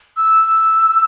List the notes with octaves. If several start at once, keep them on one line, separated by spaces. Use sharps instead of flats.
E6